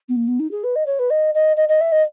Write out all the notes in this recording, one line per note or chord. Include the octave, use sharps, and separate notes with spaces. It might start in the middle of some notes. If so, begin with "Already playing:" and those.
B3
A#3
B3
D#4
G#4
B4
D#5
C#5
B4
D#5
D#5
D#5
D#5
E5
D#5